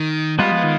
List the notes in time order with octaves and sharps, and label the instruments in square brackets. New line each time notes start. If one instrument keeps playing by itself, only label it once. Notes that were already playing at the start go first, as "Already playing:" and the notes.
Already playing: [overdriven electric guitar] D#3
[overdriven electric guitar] G3 [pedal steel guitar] G#3 B3 F4 B4
[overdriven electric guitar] F3
D#3